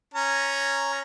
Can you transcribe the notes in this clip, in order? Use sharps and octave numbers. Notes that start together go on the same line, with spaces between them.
C#4 A#5